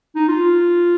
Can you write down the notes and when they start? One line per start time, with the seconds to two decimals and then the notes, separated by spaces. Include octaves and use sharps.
0.16 D#4
0.28 F4